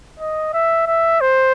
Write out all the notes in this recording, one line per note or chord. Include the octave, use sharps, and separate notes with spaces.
D#5
E5
E5
C5